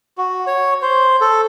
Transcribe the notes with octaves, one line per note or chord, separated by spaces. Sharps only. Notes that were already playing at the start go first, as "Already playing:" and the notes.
F#4
C#5
C5
A4